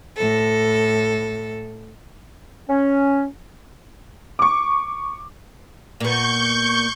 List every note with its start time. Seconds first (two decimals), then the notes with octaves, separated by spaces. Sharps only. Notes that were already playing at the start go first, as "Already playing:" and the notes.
0.16 A2 A4
2.69 C#4
4.39 C#6 D6
6.00 A#2 B3 C#6 G6